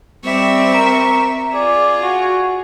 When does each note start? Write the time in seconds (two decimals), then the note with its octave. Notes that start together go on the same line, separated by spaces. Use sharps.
0.25 G3 C4 E5 C#6
0.74 A#4
1.54 F4 G#4 D5
2.02 F#4